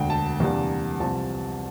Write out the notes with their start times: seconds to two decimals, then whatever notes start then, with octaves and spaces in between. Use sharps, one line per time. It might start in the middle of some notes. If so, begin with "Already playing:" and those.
Already playing: E1 D2 D3 G5
0.10 A5
0.40 E2 C3 G3 A#3 D4
1.00 C2 C3 F3 C4 A5